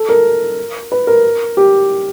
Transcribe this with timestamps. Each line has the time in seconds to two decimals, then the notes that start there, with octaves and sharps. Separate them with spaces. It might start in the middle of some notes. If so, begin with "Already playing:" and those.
Already playing: A4
0.09 A#4
0.92 B4
1.07 A#4
1.57 G4